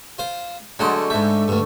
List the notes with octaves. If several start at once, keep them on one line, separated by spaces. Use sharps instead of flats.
F4 C5
D3 F#3 G#3 A3 D#5 A5
G#2 A3 E5
D2 G2